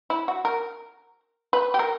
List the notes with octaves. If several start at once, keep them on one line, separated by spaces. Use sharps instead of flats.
E4
F#4
A#4
B4
G4
A#4